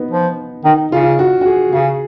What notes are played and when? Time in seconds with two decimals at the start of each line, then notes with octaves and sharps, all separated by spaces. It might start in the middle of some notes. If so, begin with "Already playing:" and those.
Already playing: B3 D#4
0.11 F3
0.64 D#3 D#4
0.92 C#3 F4
1.19 F#4
1.41 F#4
1.46 G#4
1.72 C#3 G#4